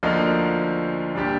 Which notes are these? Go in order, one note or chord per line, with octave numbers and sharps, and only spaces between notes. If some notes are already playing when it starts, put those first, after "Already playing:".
D2 D3 F3 A#3 D#4
A#2 G3 D4 G4